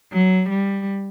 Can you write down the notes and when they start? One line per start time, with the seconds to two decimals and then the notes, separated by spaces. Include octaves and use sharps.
0.12 F#3
0.48 G3